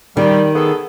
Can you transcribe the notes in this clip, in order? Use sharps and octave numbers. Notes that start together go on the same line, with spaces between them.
D#3 G3
B3 G#4 A4